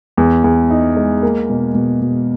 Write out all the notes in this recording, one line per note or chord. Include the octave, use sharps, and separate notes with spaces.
E2
E2
D#4
G#3
A#3
B2
B2
B2